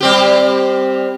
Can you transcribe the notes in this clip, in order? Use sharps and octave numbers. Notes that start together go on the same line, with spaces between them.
G3 C4 G4